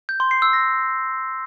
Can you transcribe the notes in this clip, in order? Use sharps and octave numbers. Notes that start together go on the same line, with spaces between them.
G6
C6
C7
E6
A#6